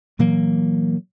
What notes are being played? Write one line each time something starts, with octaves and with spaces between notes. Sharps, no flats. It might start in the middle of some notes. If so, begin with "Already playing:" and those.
A#2 E3 F#3 A#3